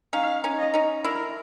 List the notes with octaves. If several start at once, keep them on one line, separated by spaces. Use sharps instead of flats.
C#4 D#4 F5
C#4 D#4
D#5
C#4 D#4
D4 E4 A#4